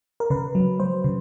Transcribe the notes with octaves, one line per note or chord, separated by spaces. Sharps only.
A#4
C#3 B4
F#3
F#3 C5
C#3